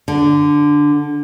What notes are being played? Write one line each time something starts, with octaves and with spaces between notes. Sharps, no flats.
D3